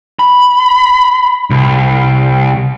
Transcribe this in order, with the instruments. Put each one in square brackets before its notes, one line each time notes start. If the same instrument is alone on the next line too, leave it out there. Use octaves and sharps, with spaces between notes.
[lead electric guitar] B5
C2